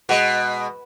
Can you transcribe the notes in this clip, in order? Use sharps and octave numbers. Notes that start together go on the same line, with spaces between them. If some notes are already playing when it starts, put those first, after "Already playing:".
B2 G#3 F#4